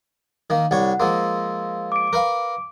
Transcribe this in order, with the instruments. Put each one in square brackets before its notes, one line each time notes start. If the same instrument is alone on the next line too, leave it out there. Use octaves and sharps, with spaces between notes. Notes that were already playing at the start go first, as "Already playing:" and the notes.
[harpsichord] D#3 A#3
[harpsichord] C2 G3 C#5 [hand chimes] F#5
[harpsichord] F3 G#3 A#3 [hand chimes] C6 E6
[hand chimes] D6 D7
[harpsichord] A#4 B4 F5